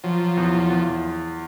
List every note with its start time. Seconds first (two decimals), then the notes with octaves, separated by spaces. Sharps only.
0.04 F3 F#3
0.37 E2
0.70 E2